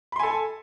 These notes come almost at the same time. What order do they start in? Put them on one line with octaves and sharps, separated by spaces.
B5 C6 G#5 A4